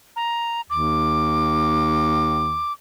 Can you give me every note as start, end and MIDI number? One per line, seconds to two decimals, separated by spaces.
0.16 0.61 82
0.70 2.62 39
0.70 2.72 86